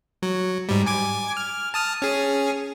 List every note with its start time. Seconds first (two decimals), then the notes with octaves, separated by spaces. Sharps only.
0.22 F#3
0.69 G#2 G3
0.86 G#5 D6 G#6
1.37 F6
1.74 A5 D#6 F6
2.02 C#4 G#4